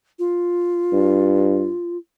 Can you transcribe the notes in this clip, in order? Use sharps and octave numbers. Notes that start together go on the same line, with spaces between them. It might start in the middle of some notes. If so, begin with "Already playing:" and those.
F4
G2